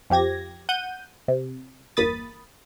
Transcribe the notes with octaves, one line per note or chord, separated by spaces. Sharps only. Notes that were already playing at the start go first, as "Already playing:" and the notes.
F2 F3 G4 G#6 A#6
F#5 G6 D#7
C3
G1 E2 A#3 B5 D#6 A6